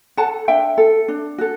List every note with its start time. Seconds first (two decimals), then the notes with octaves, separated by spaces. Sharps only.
0.17 A4 F#5 A5
0.48 D4 E5 G5
0.78 A4
1.08 D4
1.38 F#4 A4